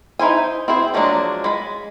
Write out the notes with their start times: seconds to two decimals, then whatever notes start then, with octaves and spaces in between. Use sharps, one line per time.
0.19 D#4 E4 C5 G#5
0.68 C4 E4 G#4 C5
0.94 F3 F#3 G#3 A#3 D4
1.44 G#3 B5